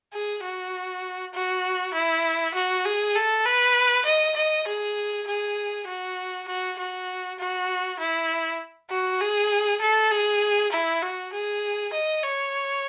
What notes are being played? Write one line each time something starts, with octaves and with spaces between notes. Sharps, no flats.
G#4
F#4
F#4
E4
F#4
G#4
A4
B4
D#5
D#5
G#4
G#4
F#4
F#4
F#4
F#4
E4
F#4
G#4
A4
G#4
E4
F#4
G#4
D#5
C#5